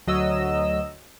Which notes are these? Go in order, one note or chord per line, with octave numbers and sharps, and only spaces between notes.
D2 F#3 D#5 E6